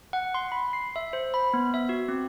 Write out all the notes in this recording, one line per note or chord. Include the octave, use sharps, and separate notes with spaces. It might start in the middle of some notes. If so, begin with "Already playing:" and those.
F#5
C6
B5
C7
E5
C5
B5
B3
E5
F#4
C4